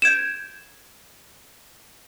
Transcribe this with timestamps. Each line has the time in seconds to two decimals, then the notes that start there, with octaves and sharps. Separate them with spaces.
0.02 G6 G#6 D7 E7